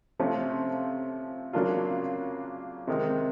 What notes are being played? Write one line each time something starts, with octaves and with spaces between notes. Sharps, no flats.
C3 F3 A3 C#4 F4
C#3 F#3 A#3 D4 F4
C3 D#3 G#3